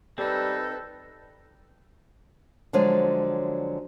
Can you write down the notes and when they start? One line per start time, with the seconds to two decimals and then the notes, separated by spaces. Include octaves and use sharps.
0.18 G3 C4 D#4 A4 B4
2.73 D3 F3 F#3 G#3 C#5